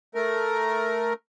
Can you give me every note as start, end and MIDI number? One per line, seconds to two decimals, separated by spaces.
0.15 1.13 57
0.15 1.13 70